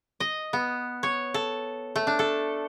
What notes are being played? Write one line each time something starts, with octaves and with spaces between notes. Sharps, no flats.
D#5
B3
C#5
A4
A3
D4
A4